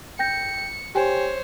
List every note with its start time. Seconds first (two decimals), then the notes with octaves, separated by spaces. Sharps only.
0.19 G5 G6 A#6 C#7
0.95 G4 C5 C#5 G5 G#5